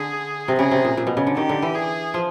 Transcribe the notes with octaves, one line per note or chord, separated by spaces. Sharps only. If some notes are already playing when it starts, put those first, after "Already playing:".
Already playing: D3 G#4
C3
C#3 G#4
C3
A#2
A#2
B2
C#3
D3
D#3 G4
D3
E3
G#4
F3